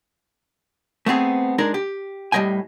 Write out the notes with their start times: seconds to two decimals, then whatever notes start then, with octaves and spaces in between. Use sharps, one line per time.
1.06 A3 B3 C4 G#4
1.58 G#3 D4 D#4 G#4 A#4
1.74 G4
2.32 A2 G3 D#5 G5 G#5